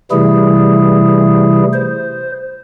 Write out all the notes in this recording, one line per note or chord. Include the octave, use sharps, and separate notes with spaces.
C3 E3 G3 A3 E4 G#4
C5